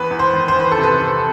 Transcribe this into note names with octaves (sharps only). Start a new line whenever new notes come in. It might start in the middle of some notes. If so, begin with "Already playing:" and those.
Already playing: E2 B4
E2
C5
D#3
C5
E2 B4
A4
C3
B4
C3